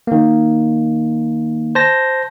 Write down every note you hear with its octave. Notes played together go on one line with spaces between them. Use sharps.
D#3 A#3
C5 A5 A#6